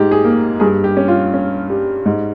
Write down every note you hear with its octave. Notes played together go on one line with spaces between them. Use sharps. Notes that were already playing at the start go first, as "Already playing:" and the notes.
Already playing: G#2 G4
G#4
A#3
G2 G#4
G4
C#4
F4
C#4
G3
G#2